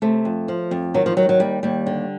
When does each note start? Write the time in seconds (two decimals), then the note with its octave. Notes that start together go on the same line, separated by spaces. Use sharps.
0.02 C3 A3
0.25 F2
0.48 F3
0.71 F2
0.94 D#3 F#3
1.06 F3
1.17 D#3 F#3
1.29 F#3
1.40 D#2 G3
1.63 D#2 G3
1.86 D3